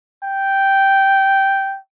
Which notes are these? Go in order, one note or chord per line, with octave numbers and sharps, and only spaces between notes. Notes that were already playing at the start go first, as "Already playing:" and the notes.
G5